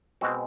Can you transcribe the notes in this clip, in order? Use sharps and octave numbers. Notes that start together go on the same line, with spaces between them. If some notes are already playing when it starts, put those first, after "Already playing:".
B2 G#3 C4 F#4